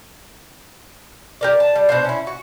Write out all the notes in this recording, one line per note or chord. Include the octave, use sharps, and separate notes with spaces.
G4 A#4 D5
A5
G3
B2 D4 C5
C#4 E4
F#4